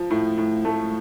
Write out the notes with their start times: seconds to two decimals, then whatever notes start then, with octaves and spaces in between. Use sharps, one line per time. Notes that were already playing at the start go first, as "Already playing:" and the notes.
Already playing: F3
0.10 A2
0.38 A2
0.65 A3